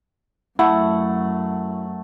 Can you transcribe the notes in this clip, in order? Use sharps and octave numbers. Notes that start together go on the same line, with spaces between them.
F#2 A3 E4 F#5